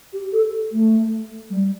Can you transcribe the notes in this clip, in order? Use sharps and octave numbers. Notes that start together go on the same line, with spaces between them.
G4
A4
A3
G3